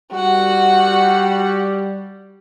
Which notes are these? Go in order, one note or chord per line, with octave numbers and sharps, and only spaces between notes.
G3 F#4 F#5